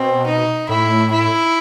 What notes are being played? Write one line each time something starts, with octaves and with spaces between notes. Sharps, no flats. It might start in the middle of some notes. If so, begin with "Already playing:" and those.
Already playing: B2 C4
D#4
A2 E4
E4